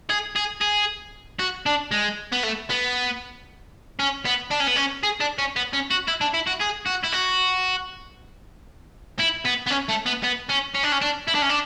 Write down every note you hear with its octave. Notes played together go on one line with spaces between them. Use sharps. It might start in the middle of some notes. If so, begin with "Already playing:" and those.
G#4
G#4
G#4
F#4
D4
G#3
B3
A3
B3
C#4
B3
D4
C#4
B3
C#4
G#4
D4
C#4
B3
C#4
F#4
E4
D4
E4
F#4
G#4
F#4
E4
F#4
E4
B3
B3
C#4
A3
B3
B3
C#4
C#4
D4
C#4
D4
E4
D4
C#4
D4